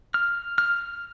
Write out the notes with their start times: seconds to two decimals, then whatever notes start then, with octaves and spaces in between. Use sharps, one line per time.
0.14 F6
0.58 F6